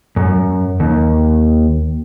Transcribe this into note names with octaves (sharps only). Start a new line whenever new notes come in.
F#2
D#2